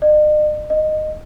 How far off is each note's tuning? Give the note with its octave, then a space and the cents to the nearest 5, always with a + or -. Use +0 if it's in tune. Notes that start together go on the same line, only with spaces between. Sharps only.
D#5 -45
D#5 -10